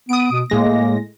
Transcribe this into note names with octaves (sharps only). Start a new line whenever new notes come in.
B3 D#6 D7
B2
A2 G#3 A#3 A#6